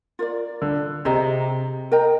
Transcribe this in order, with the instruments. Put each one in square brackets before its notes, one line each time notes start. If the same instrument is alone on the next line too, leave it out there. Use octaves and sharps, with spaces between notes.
[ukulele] F4 A#4 D5
[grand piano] D3
[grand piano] C3 [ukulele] G#4 D#5 A#5
[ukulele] A#4 D#5 G5 A#5